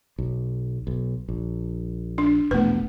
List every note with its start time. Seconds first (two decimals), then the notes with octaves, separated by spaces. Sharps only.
0.18 B1
0.87 B1
1.28 A#1
2.18 D4
2.51 E1 A#1 A3 B3 B4